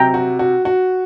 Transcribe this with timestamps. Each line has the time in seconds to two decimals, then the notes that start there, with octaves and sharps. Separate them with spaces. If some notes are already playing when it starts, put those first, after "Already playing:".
Already playing: C3 F#3 G5 A#5
0.14 F#4
0.39 F#4
0.65 F#4